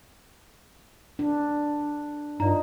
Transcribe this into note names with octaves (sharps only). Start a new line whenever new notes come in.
D4
G2 D#4 F4 D5 A#5